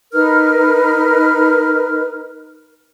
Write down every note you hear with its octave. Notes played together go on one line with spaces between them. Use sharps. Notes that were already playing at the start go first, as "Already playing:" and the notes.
D#4 A#4 B4 F6